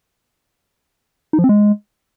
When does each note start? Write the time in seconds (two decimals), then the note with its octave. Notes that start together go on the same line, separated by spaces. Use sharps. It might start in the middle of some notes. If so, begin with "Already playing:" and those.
1.33 D#4
1.39 F3
1.44 C4
1.49 G#3